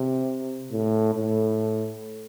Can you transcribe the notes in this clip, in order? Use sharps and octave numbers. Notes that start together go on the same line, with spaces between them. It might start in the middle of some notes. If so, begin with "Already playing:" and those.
Already playing: C3
A2
A2